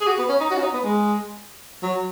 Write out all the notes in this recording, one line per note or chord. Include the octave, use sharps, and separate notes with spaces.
G#4
F#4
B3
C#4
D#4
F#4
C#4
D#4
B3
G#3
F#3